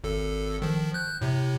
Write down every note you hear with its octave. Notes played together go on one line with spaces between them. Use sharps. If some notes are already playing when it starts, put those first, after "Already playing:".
G#1 A4
D#3 F3
F#6 G6
A2 C3